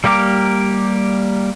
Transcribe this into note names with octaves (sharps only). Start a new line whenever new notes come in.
G3 A#3 G4 A#4 D6